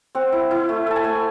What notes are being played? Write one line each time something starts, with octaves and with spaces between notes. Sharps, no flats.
C4 F#5
E4
E4
A3
A3 A5
G#5
A3